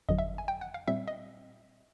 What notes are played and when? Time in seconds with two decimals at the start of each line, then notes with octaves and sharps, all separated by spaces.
0.09 G1 F2 D3 F#3 D#5
0.18 E5
0.38 G#5
0.48 G5
0.61 F#5
0.74 F5
0.87 A#2 G3 C4 E5
1.08 D#5